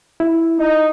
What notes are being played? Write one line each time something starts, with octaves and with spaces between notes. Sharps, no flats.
E4
D#4